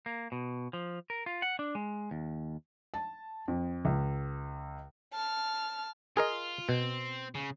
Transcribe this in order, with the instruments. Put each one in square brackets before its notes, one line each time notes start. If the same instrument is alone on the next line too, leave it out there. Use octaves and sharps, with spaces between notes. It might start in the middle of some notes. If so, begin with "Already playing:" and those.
[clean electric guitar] A#3
B2
F3
A#4
F4
F#5
D4
G#3
D#2
[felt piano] A5
F2
C#2
[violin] A5 F6
[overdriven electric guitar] F4 [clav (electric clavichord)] G#4 A#4 D#5
[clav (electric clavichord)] B2 [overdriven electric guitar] C4
[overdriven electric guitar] C#3